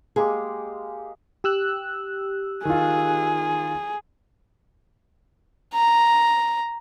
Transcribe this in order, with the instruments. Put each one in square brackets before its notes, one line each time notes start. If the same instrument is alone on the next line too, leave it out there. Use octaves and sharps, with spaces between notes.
[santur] G#3 A#3 G4 [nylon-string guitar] G#4
[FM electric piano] G4 E6 F#6
[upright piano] D#3 F4 [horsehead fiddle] G#4
[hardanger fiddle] A#5